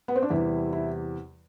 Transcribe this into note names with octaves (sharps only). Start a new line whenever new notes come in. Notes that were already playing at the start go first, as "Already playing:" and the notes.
B3
C4
D4
E2 C3 E3 G3 E4
E4